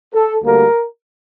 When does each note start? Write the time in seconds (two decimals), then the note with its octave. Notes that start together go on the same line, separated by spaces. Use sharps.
0.15 A4
0.44 D2 D3 G3 A#3 A#4